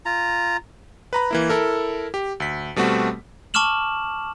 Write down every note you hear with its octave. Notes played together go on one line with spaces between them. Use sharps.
F4 A#5
B4 A#5 B5
E3 A#3 E4
E4 A4 A#4
G4
D2 B6
B2 G3 A3 C4 F#4
A5 C#6 D6 F6 E7 F#7